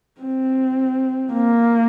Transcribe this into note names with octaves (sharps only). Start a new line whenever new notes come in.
C4
A#3